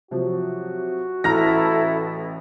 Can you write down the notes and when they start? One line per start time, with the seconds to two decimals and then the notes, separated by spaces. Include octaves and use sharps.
0.11 C3 F3 F#3 F#4
1.24 A1 E4 A4 A#5 F6 A#6